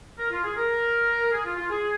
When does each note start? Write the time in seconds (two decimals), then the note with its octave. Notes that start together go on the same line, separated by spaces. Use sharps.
0.18 A#4
0.31 F4
0.44 G#4
0.56 A#4
1.32 G#4
1.45 F4
1.57 F4
1.70 G#4